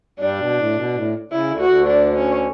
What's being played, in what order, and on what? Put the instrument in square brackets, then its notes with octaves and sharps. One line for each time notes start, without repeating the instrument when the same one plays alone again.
[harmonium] G2 G3 [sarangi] D4
[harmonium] B2
A2
B2
A2
[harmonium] C#3 [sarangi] E4
[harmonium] D2 D3
[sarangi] F#4
[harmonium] D2 D3
[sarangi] D4
C#4